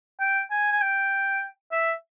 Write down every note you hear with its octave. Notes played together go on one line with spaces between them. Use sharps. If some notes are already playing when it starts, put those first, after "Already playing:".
G5
G#5
G#5
G5
E5